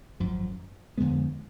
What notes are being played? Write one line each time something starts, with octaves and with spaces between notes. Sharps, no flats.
G#1 F#2 F3
F2 D3 G#3 B3